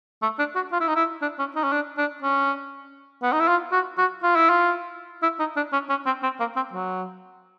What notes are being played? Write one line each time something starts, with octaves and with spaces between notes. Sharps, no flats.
A3
D4
F#4
F4
E4
D#4
E4
D4
C#4
D#4
C#4
D4
D4
C#4
B3
D#4
E4
F4
F#4
F#4
F4
E4
F4
E4
D#4
D4
C#4
C#4
C4
C4
A#3
C4
F#3